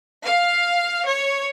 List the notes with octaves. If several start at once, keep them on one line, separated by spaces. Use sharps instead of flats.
F5
C#5